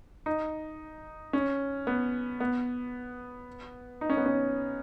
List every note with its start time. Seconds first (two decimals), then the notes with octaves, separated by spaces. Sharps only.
0.26 D#4
1.33 C#4
1.87 B3
2.40 B3
4.01 D#4
4.10 C#4
4.17 B3
4.26 C#4